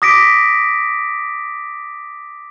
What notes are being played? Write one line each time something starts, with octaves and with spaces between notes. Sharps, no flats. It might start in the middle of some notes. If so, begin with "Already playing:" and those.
D6 D#6 A#6 B6 D7